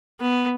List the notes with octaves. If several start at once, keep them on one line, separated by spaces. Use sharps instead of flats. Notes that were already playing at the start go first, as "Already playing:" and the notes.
B3